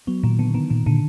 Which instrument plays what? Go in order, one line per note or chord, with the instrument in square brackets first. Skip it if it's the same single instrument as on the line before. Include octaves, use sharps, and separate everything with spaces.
[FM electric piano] F#3 [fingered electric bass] B3
[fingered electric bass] A#2 [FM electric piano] D#3
[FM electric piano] D3 [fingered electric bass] B3
[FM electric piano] D#3 [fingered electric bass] B3
[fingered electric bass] A#2 [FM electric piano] D#3
[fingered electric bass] A#2 [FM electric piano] D3